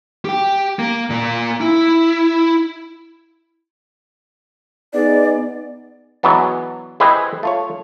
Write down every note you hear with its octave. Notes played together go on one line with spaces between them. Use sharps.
G4 G5
A#3
A#2 A#3
E4
B3 D#4 G#4 D5
E3 F#3 G#3 B3 D4
E4 G4 G#4 B4 C5 D#5
A3 F4 C#5